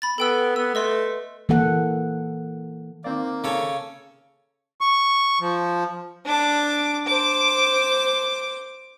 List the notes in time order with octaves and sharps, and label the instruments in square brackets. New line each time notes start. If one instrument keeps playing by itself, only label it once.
[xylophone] B5 A6
[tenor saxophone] B3 [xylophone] A4 G5 E6
[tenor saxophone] B3 [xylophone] E6
[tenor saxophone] A3 [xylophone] B4 D#5 C6
[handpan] E3 A#3 A4 F#5
[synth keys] D#3 C4 D5 [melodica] A#3
[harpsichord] C#3 A4 C#5
[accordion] C#6
F3
[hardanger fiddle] D4 D6
C5 D6